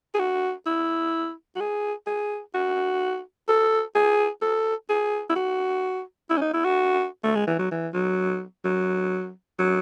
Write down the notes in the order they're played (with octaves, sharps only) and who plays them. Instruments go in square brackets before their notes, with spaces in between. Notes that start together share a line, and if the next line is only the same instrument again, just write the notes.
[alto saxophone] G#4
F#4
E4
F#4
G#4
G#4
F#4
A4
G#4
A4
G#4
E4
F#4
E4
C#4
D#4
E4
F#4
A3
G#3
E3
F#3
E3
F#3
F#3
F#3